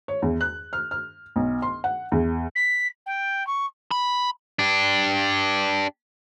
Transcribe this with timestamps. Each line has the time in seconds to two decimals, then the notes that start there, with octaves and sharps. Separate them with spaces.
0.08 C#5
0.22 E2
0.41 F#6
0.73 F6
0.91 F6
1.36 B1
1.62 C6
1.84 F#5
2.12 E2
2.55 B6
3.06 G5
3.47 C#6
3.91 B5
4.59 D4 G4